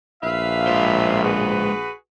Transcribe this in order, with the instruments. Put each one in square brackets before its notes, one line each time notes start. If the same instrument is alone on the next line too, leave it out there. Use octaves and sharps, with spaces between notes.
[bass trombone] A#1 [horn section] B4 E5 F5
[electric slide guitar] G#3 F4 C5
[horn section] F#4 G#4 B4